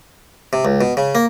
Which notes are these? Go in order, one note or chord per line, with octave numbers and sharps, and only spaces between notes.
C3
C#2
B2
C#3
A#3